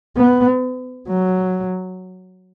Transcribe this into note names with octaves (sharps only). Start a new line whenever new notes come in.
B3
F#3